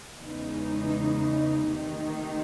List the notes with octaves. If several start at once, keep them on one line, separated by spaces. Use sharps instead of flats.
E2 C#3 E3 G#3 D#4
C3 D#3 A3 D#4